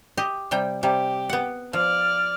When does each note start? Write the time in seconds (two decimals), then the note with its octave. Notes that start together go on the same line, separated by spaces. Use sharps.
0.17 G4 D#5
0.51 C3 G3 G5
0.83 C3 G3 G4
1.29 B3 F#5
1.73 F3 D5 F6